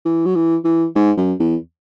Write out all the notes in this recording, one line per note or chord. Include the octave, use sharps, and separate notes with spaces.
E3
F#3
E3
E3
G#2
F#2
E2